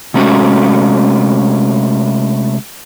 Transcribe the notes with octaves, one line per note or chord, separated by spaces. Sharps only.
C3 G#3 A3 C#4 F#4